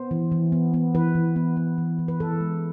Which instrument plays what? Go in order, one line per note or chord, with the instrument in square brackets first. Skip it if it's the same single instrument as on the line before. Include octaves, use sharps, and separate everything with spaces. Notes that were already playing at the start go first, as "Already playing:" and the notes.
Already playing: [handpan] B3 C5
E3
E3
B3
B3
E3 B4
E3
B3
B3
E3
E3
B4
E3 A4
G#3